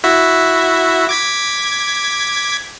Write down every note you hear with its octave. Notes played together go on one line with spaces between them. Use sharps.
E4 F#4 E5
D6 G#6 B6